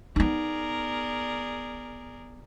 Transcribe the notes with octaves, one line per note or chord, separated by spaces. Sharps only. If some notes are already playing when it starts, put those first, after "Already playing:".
B3 D#4 G#4 A#4 D5